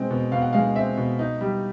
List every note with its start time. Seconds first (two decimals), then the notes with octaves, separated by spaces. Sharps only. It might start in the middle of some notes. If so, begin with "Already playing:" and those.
Already playing: B2 G#3 C4
0.10 B2
0.32 B2 F5
0.42 F#5
0.53 G#3 F5
0.76 C4 E5
0.97 B2
1.19 D#4
1.41 G3